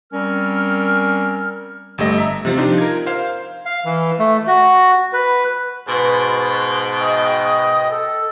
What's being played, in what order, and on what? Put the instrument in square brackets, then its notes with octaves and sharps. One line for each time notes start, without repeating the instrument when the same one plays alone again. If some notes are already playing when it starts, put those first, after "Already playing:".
[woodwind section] G3 C4 C#4 A#4 F6
[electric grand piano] G1 G3 A3 D#5 D#6
E5 A#5
C3 F3 C4 F4
D4 D#4 F4 G4
A#4 G#6
C5 F5
[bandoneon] F5
E3
A3
F#4
B4
[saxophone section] G#2 B2 [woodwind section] B4 C6
[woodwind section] D#5 G5 D#6
A4